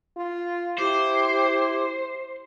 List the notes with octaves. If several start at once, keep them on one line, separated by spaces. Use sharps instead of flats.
F4 C6
E4 G4 C5 D6